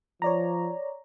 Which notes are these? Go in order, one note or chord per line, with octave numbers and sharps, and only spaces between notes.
F3 C#5 D5 A#5